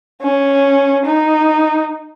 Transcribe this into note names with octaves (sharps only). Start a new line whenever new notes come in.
C#4
D#4